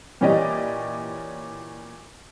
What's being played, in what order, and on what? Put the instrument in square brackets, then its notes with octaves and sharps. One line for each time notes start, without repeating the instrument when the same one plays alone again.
[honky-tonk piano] A#2 E3 C#4 G4 D5 D#5